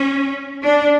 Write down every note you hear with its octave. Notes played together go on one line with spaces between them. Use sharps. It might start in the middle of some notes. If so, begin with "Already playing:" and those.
Already playing: C#4
D4